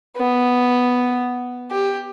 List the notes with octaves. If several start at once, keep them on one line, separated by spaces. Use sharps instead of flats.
B3
G4